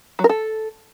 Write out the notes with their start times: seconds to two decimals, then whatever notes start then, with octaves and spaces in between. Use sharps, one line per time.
0.19 F#3
0.24 A#4
0.29 A4